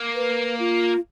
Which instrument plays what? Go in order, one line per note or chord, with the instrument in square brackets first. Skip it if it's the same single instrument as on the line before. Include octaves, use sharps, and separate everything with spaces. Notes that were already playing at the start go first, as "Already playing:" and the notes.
Already playing: [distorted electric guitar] A#3
[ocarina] B4
F4